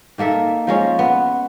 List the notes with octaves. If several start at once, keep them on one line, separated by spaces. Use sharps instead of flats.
D#3 A#3 A4 E5
F3 G#3 C#4
B3